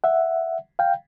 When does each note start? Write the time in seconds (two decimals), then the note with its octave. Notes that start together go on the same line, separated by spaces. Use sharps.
0.04 E5 F#5
0.79 F5 G5